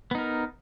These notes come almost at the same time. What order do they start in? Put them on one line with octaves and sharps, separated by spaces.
B3 D#4 A#4